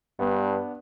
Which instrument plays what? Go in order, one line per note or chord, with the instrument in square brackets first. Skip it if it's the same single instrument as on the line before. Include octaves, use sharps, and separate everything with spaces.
[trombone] G2 [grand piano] B3 D4